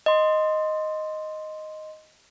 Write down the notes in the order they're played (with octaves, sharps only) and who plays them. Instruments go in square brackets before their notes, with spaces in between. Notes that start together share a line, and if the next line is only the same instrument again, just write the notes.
[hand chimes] D#5 C6